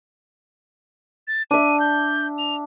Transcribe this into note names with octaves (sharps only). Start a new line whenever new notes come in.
A6
D4 E5 D#7
G6
F7